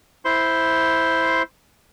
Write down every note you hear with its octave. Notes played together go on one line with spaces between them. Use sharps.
E4 C5 C6